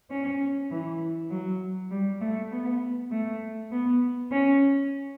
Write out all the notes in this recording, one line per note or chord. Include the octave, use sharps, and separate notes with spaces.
C#4
E3
F#3
G3
A3
B3
A3
B3
C#4